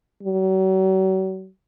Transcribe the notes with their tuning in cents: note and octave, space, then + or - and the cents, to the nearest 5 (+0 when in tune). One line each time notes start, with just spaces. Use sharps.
F#3 +40